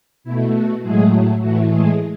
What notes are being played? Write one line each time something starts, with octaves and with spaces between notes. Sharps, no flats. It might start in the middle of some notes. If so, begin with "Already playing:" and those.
B2 A3 E4
F#4
A2 F#3 G#3 A3 G#4
A2 E3 A3 F#4
G#3 G#4